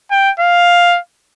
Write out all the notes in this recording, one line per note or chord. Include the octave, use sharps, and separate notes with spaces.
G5
F5